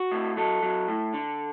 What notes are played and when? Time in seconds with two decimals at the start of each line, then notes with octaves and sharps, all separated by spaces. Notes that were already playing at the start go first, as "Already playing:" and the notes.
Already playing: F#4
0.12 A2
0.37 F#3 A4
0.62 F#3
0.88 A2
1.14 D3